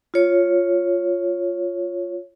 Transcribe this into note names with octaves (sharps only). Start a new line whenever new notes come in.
F4 C#5